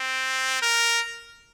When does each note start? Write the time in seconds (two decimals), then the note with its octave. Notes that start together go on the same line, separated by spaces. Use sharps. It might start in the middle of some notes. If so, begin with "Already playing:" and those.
Already playing: C4
0.62 A#4